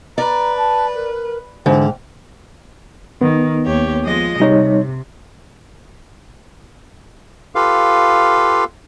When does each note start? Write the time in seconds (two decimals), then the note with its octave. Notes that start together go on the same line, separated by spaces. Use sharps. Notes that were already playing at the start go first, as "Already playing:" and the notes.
0.18 B4 D5 A#5
0.57 A5
0.95 A#4
1.66 G#2 D3 E3 E4 G5
3.21 D#3 B3
3.65 D#2 G4 C#5
4.02 F3 G#3 D#5
4.40 C3 G3 D#4 C#5
7.55 F4 G4 A4 B4 F5